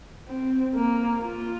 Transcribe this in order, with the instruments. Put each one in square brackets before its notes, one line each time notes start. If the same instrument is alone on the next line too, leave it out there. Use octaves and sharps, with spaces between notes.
[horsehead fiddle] C4
A#3
F4